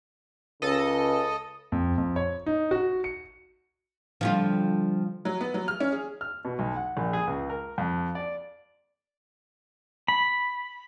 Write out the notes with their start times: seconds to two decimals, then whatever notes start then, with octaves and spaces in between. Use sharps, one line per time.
0.62 C#2 C#3 A4 D#5
1.72 F2
1.98 F2
2.16 C#5
2.46 D#4
2.71 F#4
3.04 C#7
4.21 D3 F3 G3 F4
5.25 F#3
5.41 B3
5.54 F#3
5.68 F6
5.80 C#4
5.92 G#4
6.21 F6
6.45 B2
6.59 B1
6.76 F#5
6.97 A#1
7.13 G#4
7.27 C#2
7.50 A#4
7.78 F2
8.15 D5
10.08 B5